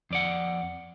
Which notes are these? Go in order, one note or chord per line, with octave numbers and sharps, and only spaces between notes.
F2 D5 F#5